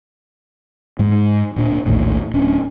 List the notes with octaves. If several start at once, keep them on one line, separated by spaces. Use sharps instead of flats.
G#2 G#3
D1 A#2 D4
A#1 D#2 A2
D1 C#4 D4